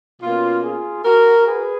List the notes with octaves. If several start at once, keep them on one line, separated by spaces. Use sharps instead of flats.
B2 A#3 C#4 F4
F4 G#4
F#4 A#4
G#4 B4